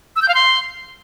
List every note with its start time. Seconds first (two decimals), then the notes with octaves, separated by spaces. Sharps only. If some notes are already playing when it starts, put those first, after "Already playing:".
0.16 E6
0.22 G6
0.28 F5
0.35 C6